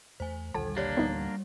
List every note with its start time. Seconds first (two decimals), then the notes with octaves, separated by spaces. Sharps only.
0.20 E2 A3 C5 G#5
0.54 A#1 D#2 D3 G3 A4 A5
0.76 A#3 D4 G4 C#5 D5
0.97 D1 D2 E3 G3 B3 D#4